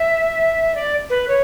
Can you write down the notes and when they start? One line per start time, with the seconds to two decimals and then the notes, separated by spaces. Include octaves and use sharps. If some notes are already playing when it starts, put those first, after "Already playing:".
Already playing: E5
0.75 D5
1.10 B4
1.28 C#5